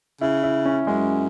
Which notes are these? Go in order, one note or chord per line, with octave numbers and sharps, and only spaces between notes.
C#3 E4
E4
C#4
F#2 G#3